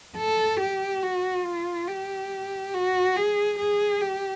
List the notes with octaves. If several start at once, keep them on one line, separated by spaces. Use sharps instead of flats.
A4
G4
F#4
F4
G4
F#4
G#4
G#4
G4